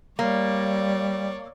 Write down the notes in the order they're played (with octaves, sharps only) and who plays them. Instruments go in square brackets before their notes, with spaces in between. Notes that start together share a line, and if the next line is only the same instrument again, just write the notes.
[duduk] G3 [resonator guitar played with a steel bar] A#3 [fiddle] C#5 D5